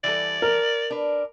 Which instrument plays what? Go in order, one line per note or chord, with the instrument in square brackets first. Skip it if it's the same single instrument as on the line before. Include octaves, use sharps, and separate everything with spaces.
[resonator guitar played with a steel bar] E3 G3 A4 [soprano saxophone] D5
[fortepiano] A#4
[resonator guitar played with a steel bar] D4 B4